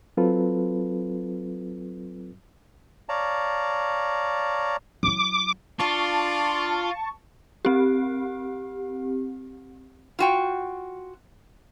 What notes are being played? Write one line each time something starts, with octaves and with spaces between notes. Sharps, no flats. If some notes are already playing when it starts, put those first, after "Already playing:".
F#3 C4 F4 A4 B4
C#5 D5 F5 A5 A#5
F#3 E4 D6
D4 F4 A5 C#6
C4 G4
F4 F#4 G5